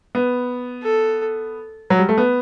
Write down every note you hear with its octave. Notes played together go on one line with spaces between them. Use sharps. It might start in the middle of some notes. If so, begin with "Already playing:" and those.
B3
A4
F#3
G3
A3
B3